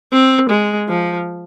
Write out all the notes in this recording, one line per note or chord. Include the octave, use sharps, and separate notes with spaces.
C4
G#3
F3